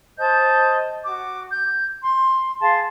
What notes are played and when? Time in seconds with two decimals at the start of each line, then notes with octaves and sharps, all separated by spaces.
0.18 C5 D#5 A5 G6
1.04 F#4 D6
1.51 G6
2.01 C6
2.60 G#4 F5 A5 C6